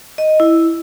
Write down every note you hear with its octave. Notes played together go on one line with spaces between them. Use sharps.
D#5
E4